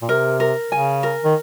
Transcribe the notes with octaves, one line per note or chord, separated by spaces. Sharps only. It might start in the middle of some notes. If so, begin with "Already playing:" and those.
A#2
C3 A#4
A#4
C#3 G#5
A#4
D#3